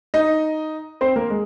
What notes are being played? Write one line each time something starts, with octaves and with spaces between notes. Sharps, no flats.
D#4 D#5
C4 C5
A#3 A#4
G#3